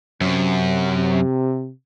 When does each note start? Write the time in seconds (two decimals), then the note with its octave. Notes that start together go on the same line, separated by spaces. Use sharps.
0.21 F#2 C3